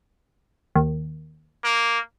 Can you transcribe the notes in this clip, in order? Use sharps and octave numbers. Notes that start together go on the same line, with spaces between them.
D#2
A#3